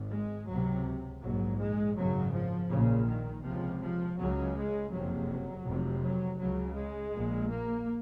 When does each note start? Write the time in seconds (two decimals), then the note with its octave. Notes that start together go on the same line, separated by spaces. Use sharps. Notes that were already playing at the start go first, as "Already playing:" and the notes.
Already playing: G#1 G#2
0.12 G#3
0.48 C#2 C3 F#3
1.22 A#1 G#2 F#3
1.59 G#3
1.96 G#1 F#2 C#3 F#3
2.33 F3
2.70 A#1 A#2 C#3
3.07 D#3
3.43 C#2 C3 F3
3.81 F3
4.17 C#2 C#3 F#3
4.55 G#3
4.91 F#1 F2 C3 F#3
5.65 F1 F2 C3
6.03 F#3
6.39 C#2 C#3 F#3
6.76 G#3
7.12 A#1 A#2
7.50 A#3